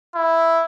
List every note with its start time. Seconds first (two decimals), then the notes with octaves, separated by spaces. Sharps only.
0.15 E4